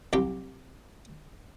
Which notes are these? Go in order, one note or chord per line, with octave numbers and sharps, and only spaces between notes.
C2 F#3 G4 G5